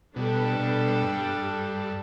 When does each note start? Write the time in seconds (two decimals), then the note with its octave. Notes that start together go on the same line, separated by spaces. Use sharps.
0.16 B2 G3 D4 A4
0.60 B2
1.02 G2